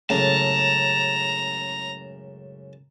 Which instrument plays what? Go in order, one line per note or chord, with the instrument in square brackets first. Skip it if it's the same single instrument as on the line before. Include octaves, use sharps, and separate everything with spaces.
[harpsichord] C#2 F#2 A2 [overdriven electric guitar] A5 [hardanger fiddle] A#5